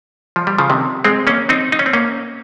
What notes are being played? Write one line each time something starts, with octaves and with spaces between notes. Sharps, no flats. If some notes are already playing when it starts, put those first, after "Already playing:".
F3
G3
C#3 F3
C3 D#3
G#3 C4
A#3 C#4
C4 D#4
D#4
C#4
C4
A#3 C#4